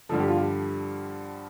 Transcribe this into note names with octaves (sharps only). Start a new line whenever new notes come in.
G2 D3 F3 A4
G4
F4
G4